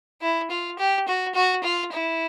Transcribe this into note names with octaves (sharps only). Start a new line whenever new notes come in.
E4
F4
G4
F#4
F#4
F4
E4